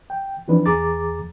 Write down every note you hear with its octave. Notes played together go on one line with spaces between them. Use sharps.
G5
E3 F3 C4 D4 D#4 B4
E2 G#4 A#5 D6 A6